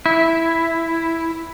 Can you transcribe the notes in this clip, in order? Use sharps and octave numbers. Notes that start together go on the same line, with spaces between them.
E4